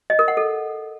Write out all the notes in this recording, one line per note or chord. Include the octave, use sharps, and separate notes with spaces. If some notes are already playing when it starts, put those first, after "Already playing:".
D#5
A#4
F#5
A4